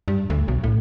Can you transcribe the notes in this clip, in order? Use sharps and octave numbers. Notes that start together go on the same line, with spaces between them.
G2
D2
B1
A2